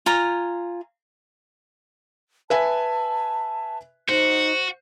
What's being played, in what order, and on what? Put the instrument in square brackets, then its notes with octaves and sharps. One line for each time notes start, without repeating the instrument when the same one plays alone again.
[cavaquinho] F4 G#5 A#5
[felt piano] B4 E5 G#5 [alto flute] A5
[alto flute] D#4 [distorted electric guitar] F#4 [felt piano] C5